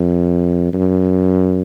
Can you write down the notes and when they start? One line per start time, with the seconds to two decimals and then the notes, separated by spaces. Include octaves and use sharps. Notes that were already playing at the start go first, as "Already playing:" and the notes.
Already playing: F2
0.74 F#2